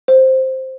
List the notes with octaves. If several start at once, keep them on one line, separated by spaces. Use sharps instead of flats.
C5